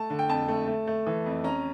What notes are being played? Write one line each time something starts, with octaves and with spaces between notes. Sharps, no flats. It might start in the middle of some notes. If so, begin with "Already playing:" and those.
Already playing: A3 A5
D3
G5
F2 A5
A3
A3
A3
E3
F2
C#4 A#5